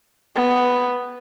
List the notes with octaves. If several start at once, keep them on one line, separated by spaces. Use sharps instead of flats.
B3